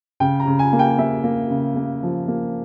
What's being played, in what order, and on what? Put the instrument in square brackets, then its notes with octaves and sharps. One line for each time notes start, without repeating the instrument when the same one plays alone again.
[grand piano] C#3 G5
A#5
C#3
G#5
A#3
G5
A#3 E5
A#3
C#3
A#3
F3
A#3